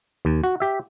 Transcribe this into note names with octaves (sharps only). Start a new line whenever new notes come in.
D#2
F#4
G4 E5